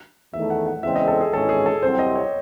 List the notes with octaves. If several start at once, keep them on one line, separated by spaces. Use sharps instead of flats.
E2 D#3 A3 E5
F#5
F#5
E2 C#3 G#3 C4 E5
D#5
A4
G#4
G#1 G#2 E3 G#3 C#4 A4
G#4
A4
C2 C3 F#3 C4 C5
D#5
C#5